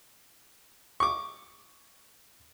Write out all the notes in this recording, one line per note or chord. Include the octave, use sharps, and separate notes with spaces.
C#6 D6